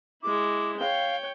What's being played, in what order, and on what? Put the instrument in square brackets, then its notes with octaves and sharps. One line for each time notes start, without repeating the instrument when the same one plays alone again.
[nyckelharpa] G#3 E4 [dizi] D6
[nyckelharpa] C#5 G5 [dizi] F5